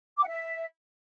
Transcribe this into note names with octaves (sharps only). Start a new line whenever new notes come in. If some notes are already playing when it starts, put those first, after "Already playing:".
D6
F#5
E5